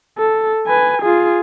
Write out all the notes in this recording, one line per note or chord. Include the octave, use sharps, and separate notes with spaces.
A4
B4 G#5
F4 G#4